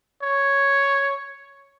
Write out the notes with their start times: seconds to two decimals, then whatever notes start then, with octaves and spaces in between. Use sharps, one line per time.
0.22 C#5